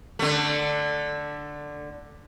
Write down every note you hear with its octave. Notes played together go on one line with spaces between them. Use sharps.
D3 A3